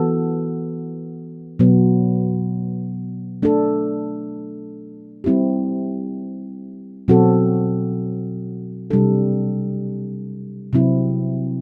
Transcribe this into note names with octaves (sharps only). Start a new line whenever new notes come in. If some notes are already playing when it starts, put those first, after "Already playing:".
Already playing: E3 B3 F#4 A4
B2 F#3 B3
A3 D4 A4
G3 C4 E4 G4
B2 F#3 C4 F#4 A4
C3 G3 D4 A4
C3 F#3 C4 E4